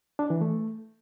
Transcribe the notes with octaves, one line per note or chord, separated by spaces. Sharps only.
D4
E3
A3